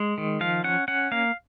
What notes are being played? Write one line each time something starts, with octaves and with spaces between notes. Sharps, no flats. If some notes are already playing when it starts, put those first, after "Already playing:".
Already playing: G#3
D#3
F3 F5
C#4 F#5
C#4 F#5
A#3 F5